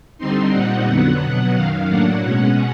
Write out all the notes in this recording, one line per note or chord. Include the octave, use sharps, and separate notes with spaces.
D3 G3 C4 D#4 C6
A#2 G3 C4 D#4 F#5
F2 D3 F#3 B3
B2 F#3 B3
F#2 D#3 F#3 F5
A2 F#3 A#3 D4 F#5
B2 G#3 C#4